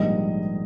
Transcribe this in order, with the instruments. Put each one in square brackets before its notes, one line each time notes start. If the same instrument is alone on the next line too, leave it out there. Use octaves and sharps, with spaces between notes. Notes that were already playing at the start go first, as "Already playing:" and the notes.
Already playing: [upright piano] A#1 G#2 D#3 G3 D#5